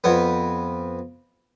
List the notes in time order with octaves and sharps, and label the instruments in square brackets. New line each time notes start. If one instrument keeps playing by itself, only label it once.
[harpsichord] F2 B3